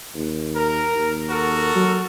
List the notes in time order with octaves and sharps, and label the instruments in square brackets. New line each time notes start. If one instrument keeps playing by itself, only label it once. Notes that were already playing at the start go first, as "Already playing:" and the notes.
[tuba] D#2
[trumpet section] A#4
[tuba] D#2
[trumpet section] F#4 A4 A#4
[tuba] F#3